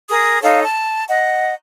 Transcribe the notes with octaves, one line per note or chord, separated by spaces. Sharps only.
G#4 A#4 D#6
D#4 A4 C#5 F5
A5
D#5 F#5